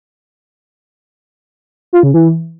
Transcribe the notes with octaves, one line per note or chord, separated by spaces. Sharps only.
F4
C#3
E3